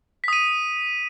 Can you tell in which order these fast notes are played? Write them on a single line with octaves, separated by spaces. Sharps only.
B6 D#6 D#7